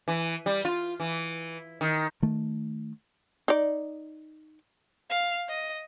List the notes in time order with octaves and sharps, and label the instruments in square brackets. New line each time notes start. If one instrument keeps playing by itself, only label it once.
[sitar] E3
G3
F4
E3
D#3
[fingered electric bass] D#3 A3
[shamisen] D#4 D5
[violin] F5
D#5